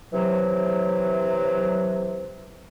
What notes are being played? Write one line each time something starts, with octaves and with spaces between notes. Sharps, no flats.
C3 E3 F#3